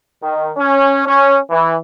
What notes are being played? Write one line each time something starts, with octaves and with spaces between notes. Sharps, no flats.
D#3
C#4
C#4
E3